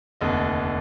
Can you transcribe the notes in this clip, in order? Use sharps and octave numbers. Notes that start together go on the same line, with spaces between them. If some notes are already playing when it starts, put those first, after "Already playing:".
F1 D#2 D3 D#5